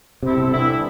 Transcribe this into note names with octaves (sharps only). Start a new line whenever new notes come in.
C3 G3 C4 E4 A4
C3
D3 E3 G3 B3 E4